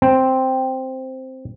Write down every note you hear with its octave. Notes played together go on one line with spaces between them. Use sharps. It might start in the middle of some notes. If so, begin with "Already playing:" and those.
C4